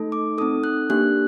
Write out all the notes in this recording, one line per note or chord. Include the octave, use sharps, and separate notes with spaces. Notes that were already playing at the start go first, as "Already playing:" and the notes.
Already playing: A3 D#4 A4
D6
C4 D#4 A4 D#6
F#6
A#3 D4 G4 F#6